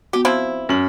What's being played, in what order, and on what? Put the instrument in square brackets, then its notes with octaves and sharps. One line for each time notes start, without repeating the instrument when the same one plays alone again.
[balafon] B3 F#4 [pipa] G4
[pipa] F3 C4 E4
[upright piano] F#2 F#7